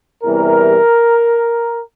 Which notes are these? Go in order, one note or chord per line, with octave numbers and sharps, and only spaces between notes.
E2 C3 E3 G3 A#4